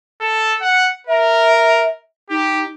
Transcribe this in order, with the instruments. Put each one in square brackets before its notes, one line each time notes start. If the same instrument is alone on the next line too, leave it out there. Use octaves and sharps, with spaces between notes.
[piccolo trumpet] A4
F#5
[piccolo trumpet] A#4 [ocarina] E5
[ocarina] D#4 [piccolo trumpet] G4